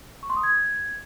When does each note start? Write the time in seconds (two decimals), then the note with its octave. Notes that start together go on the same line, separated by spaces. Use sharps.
0.23 C#6
0.30 C6
0.37 D#6
0.43 G#6